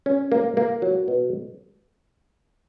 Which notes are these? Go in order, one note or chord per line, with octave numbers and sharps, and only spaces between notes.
C#4
A#3
A#3
F#3
B2